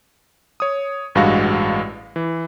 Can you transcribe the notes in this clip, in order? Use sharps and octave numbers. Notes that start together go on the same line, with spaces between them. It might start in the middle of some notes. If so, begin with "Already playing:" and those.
C#5 D#6
A1 G2 G#3 F#4 F5 A#6
E3